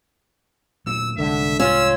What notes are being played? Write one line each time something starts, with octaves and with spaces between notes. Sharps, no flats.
A#2 F#3 A3 E6
C2 G#2 D3 E5
C#4 F4 E6